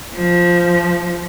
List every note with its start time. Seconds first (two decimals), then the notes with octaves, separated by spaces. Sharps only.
0.15 F3